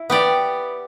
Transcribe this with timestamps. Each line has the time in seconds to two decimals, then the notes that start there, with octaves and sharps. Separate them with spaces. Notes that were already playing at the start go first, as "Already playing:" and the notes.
Already playing: E4
0.10 B3 G4 D5